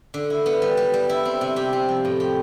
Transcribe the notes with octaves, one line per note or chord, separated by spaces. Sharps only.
D3
E4
B3
G3
G3
G3
E4
C4
C3
G4
C4
F3
A2
G4